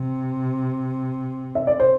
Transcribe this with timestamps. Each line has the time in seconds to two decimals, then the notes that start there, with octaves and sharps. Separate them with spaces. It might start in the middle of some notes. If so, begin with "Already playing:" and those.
Already playing: C3
1.55 E5
1.67 D5
1.80 C5